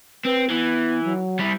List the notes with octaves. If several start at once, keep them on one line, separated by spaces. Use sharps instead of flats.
C4 B4
E3 B3
F#3
G3 E4